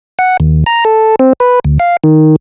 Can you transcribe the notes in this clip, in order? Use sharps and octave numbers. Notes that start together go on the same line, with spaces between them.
F#5
D#2
A#5
A4
C4
B4
D2
F5
D#3